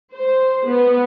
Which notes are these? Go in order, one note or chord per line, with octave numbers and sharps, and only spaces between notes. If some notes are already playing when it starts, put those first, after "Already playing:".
C5
B3